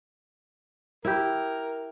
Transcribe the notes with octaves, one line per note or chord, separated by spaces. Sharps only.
E4 G4 A#4